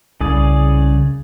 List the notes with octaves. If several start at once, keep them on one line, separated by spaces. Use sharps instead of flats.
C2 C#3 G#4 D5